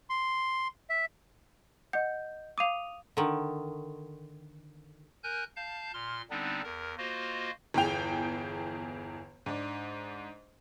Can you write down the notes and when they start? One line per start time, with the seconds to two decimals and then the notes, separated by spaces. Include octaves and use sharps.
0.10 C6
0.90 E5
1.93 D#5 F#5 G6
2.58 F5 D6 D#6 D#7 F7
3.17 D3 D#3
5.24 A#4 G#5 F#6 G6
5.56 F5 A5 G6
5.94 A#2 C6 F6
6.30 D3 G3 B3 C4 D4 D#4
6.64 E2 A#4
6.98 A#3 F4 F#4 C5 D#5
7.74 G1 E2 G#4 G5 F7
9.46 G#2 D4